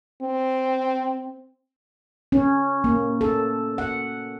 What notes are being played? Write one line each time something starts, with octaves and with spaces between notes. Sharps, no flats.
C4
C#4
A#3
A4
F#5